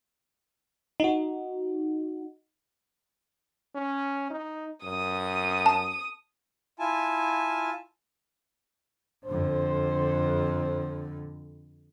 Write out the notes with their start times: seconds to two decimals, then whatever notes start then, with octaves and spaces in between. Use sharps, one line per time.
1.00 D#4 F#4
3.75 C#4
4.30 D#4
4.84 F#2 D#6
5.66 A5
6.79 E4 F4 G#5 A5
9.26 F2 D3 C5